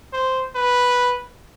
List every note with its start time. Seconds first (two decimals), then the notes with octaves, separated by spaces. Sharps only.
0.13 C5
0.55 B4